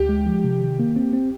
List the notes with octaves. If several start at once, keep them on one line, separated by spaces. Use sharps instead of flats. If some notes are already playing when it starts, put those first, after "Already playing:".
Already playing: D2 G4
G#3
F3
C3
D#3
A#3
C4
C4